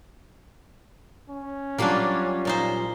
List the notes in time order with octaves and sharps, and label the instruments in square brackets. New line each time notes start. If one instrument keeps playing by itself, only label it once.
[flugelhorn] C#4
[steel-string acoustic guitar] F#3 G3 F4 [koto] A#3 D4
[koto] A#2 D#4 C5